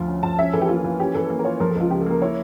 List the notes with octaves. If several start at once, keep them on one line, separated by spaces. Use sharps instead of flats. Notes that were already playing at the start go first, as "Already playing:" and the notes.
Already playing: D2 F3 F4
C#4
F3 A5
C#4 E5
E3 A4
G4
A#3 F4
E3
C#4 G4
E3 A4
A#3
A#4
F4 C#5
F3 A#4
A4
C#2 F4
C#3 G4
A4
A#3 A#4
E4 C#5